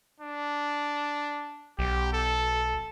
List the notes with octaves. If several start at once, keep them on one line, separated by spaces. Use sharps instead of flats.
D4
B1 G4
A4